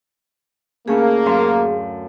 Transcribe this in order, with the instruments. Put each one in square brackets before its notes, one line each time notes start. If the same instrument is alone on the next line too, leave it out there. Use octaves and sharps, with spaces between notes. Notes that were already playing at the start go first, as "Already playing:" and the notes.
[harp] D2 C#4 E4 [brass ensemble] A#3 [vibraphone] G#4
[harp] F#2 F5 C6